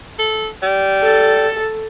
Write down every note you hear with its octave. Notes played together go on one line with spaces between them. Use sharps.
A4
G3
A4